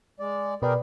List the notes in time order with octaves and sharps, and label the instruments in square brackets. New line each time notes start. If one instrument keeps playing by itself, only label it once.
[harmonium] G#3 D5
[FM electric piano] B2 B4 D5 [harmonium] G4 G#4 A#4